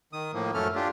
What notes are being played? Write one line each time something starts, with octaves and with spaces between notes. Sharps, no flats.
D#3 D#6
A2 F3 A#3
F#2 A3 C#4 A4 F6
D4 F4 G4